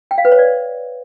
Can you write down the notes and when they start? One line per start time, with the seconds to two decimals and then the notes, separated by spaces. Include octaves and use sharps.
0.11 G5
0.18 F5
0.25 B4
0.32 C#5
0.39 D5